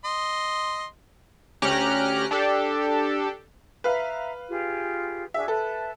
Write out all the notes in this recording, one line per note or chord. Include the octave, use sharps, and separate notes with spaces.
D#5 C6
D2 C#4 G4 A#5 F6 F#6
D4 G4 A4
B4 E5 F5 A#5
F4 G4 G#4
D4 F#4 G#4 E5
A4 B4 E5 A5